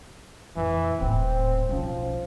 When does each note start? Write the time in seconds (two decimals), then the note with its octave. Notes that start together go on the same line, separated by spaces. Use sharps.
0.56 F2 A#2 E3
1.00 D#1 A2 C4
1.69 B1 F3 C#4